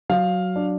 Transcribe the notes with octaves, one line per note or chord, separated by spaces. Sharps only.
F#3 F5
D4